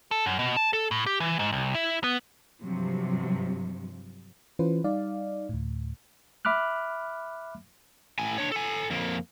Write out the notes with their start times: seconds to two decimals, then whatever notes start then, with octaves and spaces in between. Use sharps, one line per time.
0.11 A4
0.26 F#2
0.39 B2
0.57 A5
0.73 A4
0.91 A2
1.06 G4
1.20 E3
1.39 G#2
1.53 C2
1.74 E4
2.04 B3
2.61 G2 C3 F3 F#3
4.59 E3 C#4 F4 B4 C5
4.84 G3 D#4 D5 F5
5.49 D2 A2
6.45 E5 B5 D6 F6 F#6
8.19 A2 G#5
8.38 D4 C#5
8.52 A4 G#5
8.90 F2 A#3